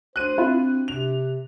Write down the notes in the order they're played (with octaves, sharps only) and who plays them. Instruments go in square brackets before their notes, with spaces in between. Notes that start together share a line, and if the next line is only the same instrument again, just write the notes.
[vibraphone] D4 F#4 [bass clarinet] C5 [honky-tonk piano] F#6 D#7
[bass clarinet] C4 [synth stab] E4 F4
[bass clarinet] C3 [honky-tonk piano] F7